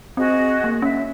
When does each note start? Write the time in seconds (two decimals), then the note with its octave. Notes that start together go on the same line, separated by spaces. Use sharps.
0.17 C4 F#4 G#4 D#5
0.64 A#3
0.82 C#4 E5